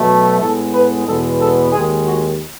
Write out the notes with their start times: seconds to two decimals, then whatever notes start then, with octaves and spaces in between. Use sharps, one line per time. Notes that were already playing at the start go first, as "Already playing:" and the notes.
Already playing: B2 F#3 A3
0.40 A2 G#3 B3 A4
0.73 B4
1.06 E2 B2 G#3 B3 A4
1.40 A4
1.72 D#2 D#3 G#3 G#4
2.05 F#4